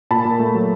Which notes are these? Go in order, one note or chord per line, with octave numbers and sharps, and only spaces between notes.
A#2 A5 B5
A#2
A3
F#3